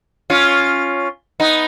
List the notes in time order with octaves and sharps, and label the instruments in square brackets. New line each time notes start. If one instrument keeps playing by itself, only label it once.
[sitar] C#4 F4
B3 D#4